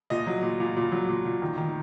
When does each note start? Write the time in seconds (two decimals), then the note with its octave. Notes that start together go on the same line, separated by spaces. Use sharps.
0.10 A#2 D#5
0.27 F#3
0.43 A#2
0.60 A#2
0.77 A#2
0.92 F#3
1.08 A#2
1.25 A#2
1.42 D#3
1.58 D#3